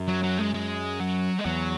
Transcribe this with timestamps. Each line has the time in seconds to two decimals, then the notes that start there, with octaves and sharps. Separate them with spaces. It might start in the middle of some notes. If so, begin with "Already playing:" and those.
Already playing: F#2
0.08 F#3
0.24 F#3
0.39 G#3
0.54 G#3
1.00 F#3
1.39 G#3
1.45 E2 F#3